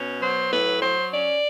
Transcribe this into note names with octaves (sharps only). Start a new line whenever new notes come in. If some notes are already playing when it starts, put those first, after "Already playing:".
Already playing: B2 C#4
F#3 C5
A2 B4
F#3 C5
C#4 D5